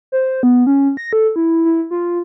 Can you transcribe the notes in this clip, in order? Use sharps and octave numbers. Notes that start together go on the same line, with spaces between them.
C5
B3
C#4
A#6
A4
E4
E4
F4